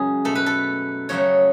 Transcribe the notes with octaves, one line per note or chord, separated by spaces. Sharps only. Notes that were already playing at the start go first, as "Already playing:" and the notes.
Already playing: F#2 C#3 G#3 G#4
B2 A3 A4
B4
A4
F#2 C#3 F#3 A3 C#5